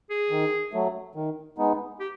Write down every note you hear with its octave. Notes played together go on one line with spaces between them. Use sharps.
G#4
D#3
F#3 A3
D#3
G#3 B3 D#4
G4